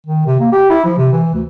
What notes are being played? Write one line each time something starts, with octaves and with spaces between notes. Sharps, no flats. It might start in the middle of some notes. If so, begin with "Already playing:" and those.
D#3
C3
A#3
G4
E4
F3
C3
E3
D2